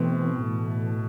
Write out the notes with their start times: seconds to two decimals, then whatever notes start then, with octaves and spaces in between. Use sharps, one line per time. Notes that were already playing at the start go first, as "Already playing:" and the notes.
Already playing: B2 E3 A3 C4
0.41 A2 E3 A3